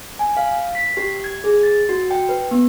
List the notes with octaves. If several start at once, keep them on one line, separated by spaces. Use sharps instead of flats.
G#5
F5
B6
G4
G#6
G#4
A6
F#4
G5
B4
B3